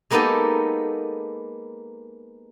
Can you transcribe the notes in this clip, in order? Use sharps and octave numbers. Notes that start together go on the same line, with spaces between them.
G#3 A#3 B3 D#4 G4 A4